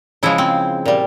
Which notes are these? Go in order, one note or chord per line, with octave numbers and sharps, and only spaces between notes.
C#3 F3 G#3 E4
C4
A#2 G3